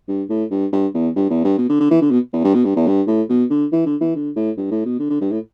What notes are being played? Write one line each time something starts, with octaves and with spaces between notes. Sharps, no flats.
G2
A2
G2
G2
E2
G2
E2
G2
B2
D3
D3
E3
D3
B2
E2
G2
B2
G2
E2
G2
A2
B2
D3
E3
D3
E3
D3
A2
G2
A2
B2
D3
D3
G2
A2